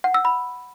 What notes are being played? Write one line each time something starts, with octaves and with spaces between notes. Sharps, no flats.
F#5
E6
B5